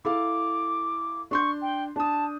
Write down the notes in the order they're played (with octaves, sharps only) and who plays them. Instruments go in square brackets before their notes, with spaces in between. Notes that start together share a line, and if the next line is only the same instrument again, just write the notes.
[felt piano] E4 A4 F5 [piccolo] D6
[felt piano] D4 C6 G6 [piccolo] C#6
[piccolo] G5
[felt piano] D4 D#6 [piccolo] A5